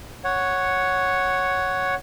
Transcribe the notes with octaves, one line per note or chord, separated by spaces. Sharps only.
C#5 F#5